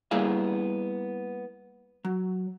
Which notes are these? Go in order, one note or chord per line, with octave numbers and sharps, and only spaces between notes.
G3 A#3 B3 E4 G#4 F5
F#3